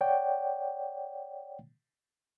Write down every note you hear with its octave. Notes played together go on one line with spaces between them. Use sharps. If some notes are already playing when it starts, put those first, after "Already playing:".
C#5 D5 F#5 G5